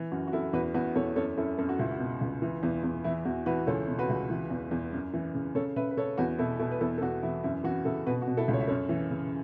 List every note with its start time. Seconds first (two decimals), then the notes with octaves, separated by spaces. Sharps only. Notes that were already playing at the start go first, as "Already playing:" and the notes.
Already playing: E3
0.12 F#2 F#4
0.27 F#4
0.33 F#2 E4 A4
0.53 E2 F#4 B4
0.74 E2 F#4 B4
0.95 E2 A4 C#5
1.16 F#2 A4 C#5
1.37 F#2 E4 A4
1.58 F#2 A4
1.69 F#4
1.79 C#2 E4
1.91 F#4
1.99 B2
2.21 C#2
2.42 E3
2.63 E2
2.84 E2
3.04 E3 E4
3.25 E2 F#4
3.46 E3 F#4 B4
3.67 C#2 A4 C#5
3.88 B2
3.99 F#4 B4
4.09 C#2
4.30 E3
4.50 E2
4.71 E2
4.93 F#2
5.14 E3
5.34 C#3
5.55 C#3 A4 C#5
5.76 C#3 B4 E5
5.91 B4
5.97 C#3 A4 C#5
6.18 E2 F#4 B4
6.38 B2 E4 A4
6.59 B2 E4 A4
6.71 B4
6.81 E2 E4 A4
6.98 A4
7.02 E2 F#4
7.23 E3 E4
7.44 F#2 E4
7.64 E3 F#4
7.85 C#3 E4 A4
8.06 B2 F#4 B4
8.22 F#4
8.28 B2
8.37 E4 A4
8.48 C#2
8.53 C#5
8.60 E5
8.68 F#2 A4 C#5
8.89 E3
9.11 C#3